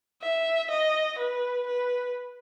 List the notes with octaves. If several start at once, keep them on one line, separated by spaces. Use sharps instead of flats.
E5
D#5
B4
B4